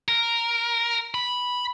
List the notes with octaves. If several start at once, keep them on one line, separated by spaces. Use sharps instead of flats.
A#4
B5